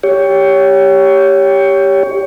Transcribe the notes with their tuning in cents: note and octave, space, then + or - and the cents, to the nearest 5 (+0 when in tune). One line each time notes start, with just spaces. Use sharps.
G4 +5 C#5 +15